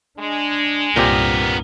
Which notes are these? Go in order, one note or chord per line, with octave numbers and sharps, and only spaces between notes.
G#3 D4
C2 G2 A#2 B3 C4 G4 A#4